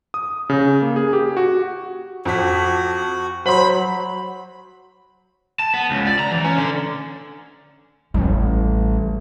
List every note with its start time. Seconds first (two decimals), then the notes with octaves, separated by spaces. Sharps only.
0.14 D#6
0.50 C#3
0.82 A#3
0.96 G#4
1.13 G4
1.37 F#4
2.25 F2 F#4 B6
3.46 F#3 C5 B5 C6
5.59 A5
5.74 B3
5.91 C#2
6.07 D5
6.19 A#5
6.31 E3
6.44 C#4
6.56 D3
8.14 A1 G3 A3